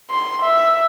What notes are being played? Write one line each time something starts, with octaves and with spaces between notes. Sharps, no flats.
C6
E5